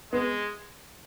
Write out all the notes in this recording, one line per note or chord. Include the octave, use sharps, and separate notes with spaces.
G#3 B3